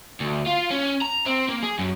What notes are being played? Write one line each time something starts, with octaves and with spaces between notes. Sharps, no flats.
D2
F4
C#4
A#5
C4
A#3
G#4
F#2